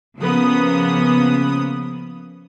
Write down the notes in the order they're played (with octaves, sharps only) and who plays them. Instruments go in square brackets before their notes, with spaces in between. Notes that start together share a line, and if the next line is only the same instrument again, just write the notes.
[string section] C#3 F3 A#3 B3 D#6